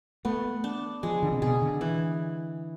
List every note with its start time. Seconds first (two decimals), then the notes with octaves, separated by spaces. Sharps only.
0.25 A3 B3
0.64 D4
1.03 F3 G#3
1.23 D3
1.32 C3
1.42 B2 G#4
1.62 D3
1.81 E3